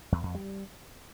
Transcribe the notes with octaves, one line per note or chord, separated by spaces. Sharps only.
E2
F2
G3